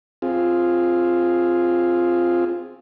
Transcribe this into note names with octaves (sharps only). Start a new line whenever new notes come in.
C4 F4 G#4